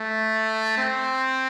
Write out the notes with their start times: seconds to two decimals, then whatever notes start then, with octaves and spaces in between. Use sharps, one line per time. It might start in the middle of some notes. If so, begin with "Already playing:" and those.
Already playing: A3
0.78 C4